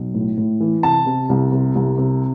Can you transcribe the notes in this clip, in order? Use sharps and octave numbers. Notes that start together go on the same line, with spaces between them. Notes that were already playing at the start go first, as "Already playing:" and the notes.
Already playing: B1
A2
A2
E3
C3 A5
C3
C2
C3
C2
C3